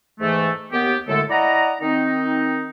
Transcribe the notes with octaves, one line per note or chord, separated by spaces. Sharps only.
G#2 E3 A3
D#2 B3 G4
F#2 A2 D3 G#3 A3 A4
E4 D5 D#5 F#5 A#5
D#3 C4 D#4